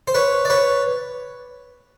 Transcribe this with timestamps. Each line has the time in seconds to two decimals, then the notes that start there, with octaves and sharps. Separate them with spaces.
0.07 C5
0.14 B4 C#5
0.45 D5
0.50 B4 C#5